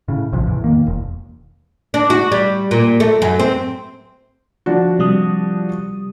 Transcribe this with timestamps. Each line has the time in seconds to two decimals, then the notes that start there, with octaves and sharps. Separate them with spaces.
0.08 A2 C#3
0.32 A#1 C3 E3 F3
0.47 E2 A2
0.64 D#3 A#3
0.86 E1
1.94 D4
2.10 F#4
2.32 G3
2.71 A#2
3.00 A3
3.22 F#2
3.39 C4
4.66 F3 D4 F#4
4.99 C3 G3 D#6